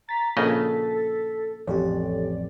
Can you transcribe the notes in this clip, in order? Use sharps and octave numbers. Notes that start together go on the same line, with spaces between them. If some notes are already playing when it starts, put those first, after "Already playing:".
A#5 A6 B6
A#1 C#3 A4 D#5
A1 F2 G4 A4 C#5 D5